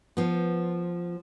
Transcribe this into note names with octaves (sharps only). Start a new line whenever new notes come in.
F3 B3